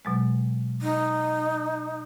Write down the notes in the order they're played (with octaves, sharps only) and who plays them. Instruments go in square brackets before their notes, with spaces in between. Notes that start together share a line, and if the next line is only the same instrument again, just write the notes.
[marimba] B2 F#3 G#3
[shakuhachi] D#4